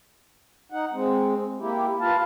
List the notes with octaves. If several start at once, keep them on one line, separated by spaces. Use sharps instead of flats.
D#4 F#5
G#3 C4
A#3 E4 G4
F4 B4 F5 A5